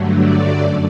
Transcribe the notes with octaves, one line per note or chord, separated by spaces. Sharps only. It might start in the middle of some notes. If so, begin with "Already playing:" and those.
Already playing: G2 D3 F#3 A3
D5
F#2